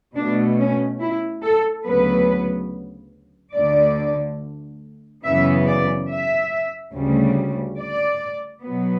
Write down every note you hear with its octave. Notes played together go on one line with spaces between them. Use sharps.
B2 A3 D4
C#4
E4
A4
D2 C#3 F#3 B3 B4
D2 D3 A3 D5
F#2 C#3 E3 B3 E5
D5
E5
D2 C#3 G3
D5
B2 F#3 B3